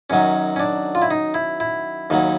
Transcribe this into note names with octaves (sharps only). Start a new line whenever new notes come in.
F#2 D#3 F#3 C#4
C#4
D4
F4
E4
D#4
E4
E4
D#2 D#3 F#3